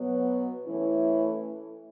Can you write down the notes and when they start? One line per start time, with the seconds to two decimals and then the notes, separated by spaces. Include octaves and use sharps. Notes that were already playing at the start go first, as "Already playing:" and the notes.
Already playing: B2 F#3 B3
0.66 E3 A3 C#4 E4